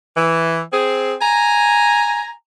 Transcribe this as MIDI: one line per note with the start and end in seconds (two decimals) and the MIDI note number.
0.16 0.61 52
0.73 1.14 60
0.73 1.14 68
1.21 2.31 80
1.21 2.31 82